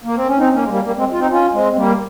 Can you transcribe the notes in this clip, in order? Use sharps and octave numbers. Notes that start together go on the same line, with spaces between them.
A#3
C4
C#4
C4 D#4
A#3 C#4
G#3
G3 A#3
G3 A#3
G#3 C4
F4
C4 D#4
C#4 F4
G#3 C4
C4
G3 A#3